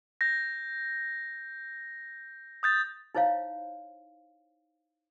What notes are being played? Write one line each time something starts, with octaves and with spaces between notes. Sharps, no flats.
G6 A#6
D#6 G6 A6
D#4 E4 C5 C#5 F5